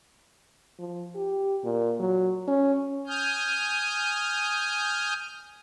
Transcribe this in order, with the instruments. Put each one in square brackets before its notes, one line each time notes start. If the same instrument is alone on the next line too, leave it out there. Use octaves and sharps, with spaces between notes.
[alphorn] F3
G4
A#2
F#3
C#4
[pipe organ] G#5 D#6 F6 G6